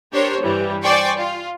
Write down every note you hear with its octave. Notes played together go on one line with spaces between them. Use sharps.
D4 G4 A#4 C5 C#5
G2 E3 G3
C5 D5 G5 G#5 C6 C#6
F4